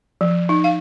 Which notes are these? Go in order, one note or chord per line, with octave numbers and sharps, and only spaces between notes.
F3
D#4
F5